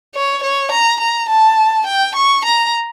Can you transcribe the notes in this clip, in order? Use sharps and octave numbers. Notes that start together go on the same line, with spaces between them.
C#5
C#5
A#5
A#5
A5
G5
C#6
A#5